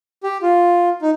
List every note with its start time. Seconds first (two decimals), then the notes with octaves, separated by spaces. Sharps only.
0.23 G4
0.42 F4
1.02 D#4